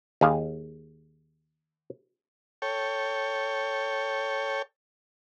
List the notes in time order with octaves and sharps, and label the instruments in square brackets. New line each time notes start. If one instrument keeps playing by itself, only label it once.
[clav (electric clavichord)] D#2 G#4 F5
[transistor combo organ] A4 C#5 G5